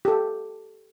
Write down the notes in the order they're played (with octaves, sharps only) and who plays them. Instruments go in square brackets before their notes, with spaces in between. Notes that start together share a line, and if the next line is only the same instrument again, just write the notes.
[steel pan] G4 A4